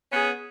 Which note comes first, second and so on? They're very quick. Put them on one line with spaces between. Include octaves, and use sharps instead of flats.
C#4 B3 G#4